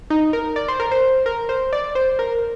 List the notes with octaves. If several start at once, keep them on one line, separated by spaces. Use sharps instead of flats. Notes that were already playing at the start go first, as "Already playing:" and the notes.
D#4
A#4
D5
C5
A#4
C5
A#4
C5
D5
C5
A#4